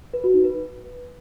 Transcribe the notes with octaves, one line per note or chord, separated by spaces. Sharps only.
B4
F#4
D#4
B4